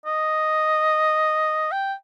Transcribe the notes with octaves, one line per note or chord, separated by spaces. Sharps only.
D#5
G5